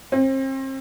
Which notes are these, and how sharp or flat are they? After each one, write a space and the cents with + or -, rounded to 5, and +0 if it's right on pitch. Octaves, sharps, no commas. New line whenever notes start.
C4 +35